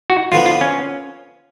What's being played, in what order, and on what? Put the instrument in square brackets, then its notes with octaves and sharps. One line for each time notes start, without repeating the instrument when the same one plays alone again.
[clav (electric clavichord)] F#4
[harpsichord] D3 F3 B3 [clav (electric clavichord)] F4
[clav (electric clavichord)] F4
C#4